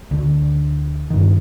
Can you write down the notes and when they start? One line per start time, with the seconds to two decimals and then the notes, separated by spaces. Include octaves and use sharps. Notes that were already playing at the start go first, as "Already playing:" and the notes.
0.11 D2 D3
1.10 G2 D#3